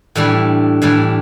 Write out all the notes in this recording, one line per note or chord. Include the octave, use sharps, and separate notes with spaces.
A2 E3 G3 D4
A2 E3 G3 D4